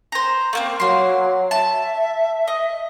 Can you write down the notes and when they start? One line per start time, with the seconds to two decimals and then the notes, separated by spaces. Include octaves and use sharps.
0.12 C5 A#5
0.53 A3 A#3 C4
0.80 F#3 A#3 C6
1.51 E5 A5
2.48 D#5